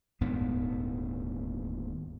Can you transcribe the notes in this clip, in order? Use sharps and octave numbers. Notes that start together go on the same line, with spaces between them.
D#1 D2 G#2 B3